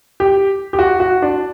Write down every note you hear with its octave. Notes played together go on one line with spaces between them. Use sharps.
G4
G4
F#4
F#4
D4